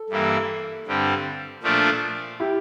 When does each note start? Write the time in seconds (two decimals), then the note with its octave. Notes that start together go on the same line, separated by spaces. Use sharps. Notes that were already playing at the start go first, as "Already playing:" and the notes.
Already playing: A4
0.10 G2 E3 A#3 E4
0.87 G2 D3 G3 C4
1.63 A#2 F3 A3 D4 F4
2.40 E4 G4